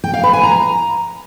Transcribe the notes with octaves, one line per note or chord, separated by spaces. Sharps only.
G5
F5
B4
G#5
A#5